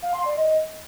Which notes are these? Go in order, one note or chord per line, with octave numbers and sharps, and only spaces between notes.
F5
C6
D5
D#5